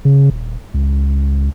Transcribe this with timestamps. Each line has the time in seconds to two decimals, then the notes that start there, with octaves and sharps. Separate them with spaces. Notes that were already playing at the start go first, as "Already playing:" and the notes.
0.05 C#3
0.30 D#1
0.74 C#2